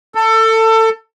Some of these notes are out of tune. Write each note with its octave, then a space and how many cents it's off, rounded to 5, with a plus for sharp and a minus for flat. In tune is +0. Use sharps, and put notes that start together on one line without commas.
A4 +25